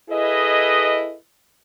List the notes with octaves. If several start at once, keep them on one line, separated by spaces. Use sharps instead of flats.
E4 G#4 A4 B4 D#5